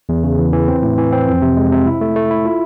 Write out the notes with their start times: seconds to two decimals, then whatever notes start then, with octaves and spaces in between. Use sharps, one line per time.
0.09 E2
0.24 C#3
0.39 E3
0.53 E3
0.68 C4
0.83 A2
0.98 E3
1.12 C4
1.27 F2
1.42 C3
1.57 G#3
1.71 C3
1.86 E4
2.01 A3
2.16 A3
2.31 E4
2.45 F4